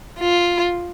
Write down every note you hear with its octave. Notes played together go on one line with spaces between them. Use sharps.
F4